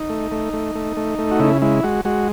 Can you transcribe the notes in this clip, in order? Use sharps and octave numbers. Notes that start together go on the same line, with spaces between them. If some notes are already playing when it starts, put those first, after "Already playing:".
Already playing: D#4
A3
A3
A3
A3
A3
A3
F#4
C#3 E4
G#3 E4
G#3 F#4
G#3 F#4